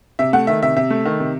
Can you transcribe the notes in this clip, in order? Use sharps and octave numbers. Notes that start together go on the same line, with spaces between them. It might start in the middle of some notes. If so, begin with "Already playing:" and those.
C3 E5
A3 F#5
D#3 E5
C3 E5
C3 E5
A3
D#3
C3